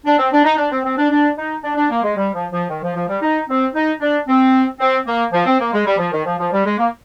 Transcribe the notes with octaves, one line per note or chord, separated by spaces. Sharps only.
D4
C4
D4
D#4
D4
C4
C4
D4
D4
D#4
D4
D4
A#3
G#3
G3
F3
F3
D#3
F3
F3
G3
D#4
C4
D#4
D4
C4
C4
A#3
F3
C4
A#3
G#3
G3
F3
D#3
F3
F3
G3
G#3
A#3